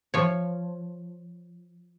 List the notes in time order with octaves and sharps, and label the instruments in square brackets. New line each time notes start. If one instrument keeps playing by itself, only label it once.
[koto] F3 C#5